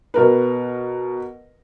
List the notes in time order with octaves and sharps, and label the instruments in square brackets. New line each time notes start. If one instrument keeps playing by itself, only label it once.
[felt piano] B2 A#4 B4